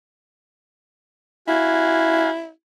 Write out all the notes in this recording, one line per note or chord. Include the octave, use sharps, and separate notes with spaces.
E4 F#4 F5 G#5